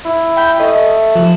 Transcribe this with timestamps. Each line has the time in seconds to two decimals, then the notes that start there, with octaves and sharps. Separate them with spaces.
0.05 E4
0.37 G5 B5 G6
0.60 A3 D#5
1.15 F3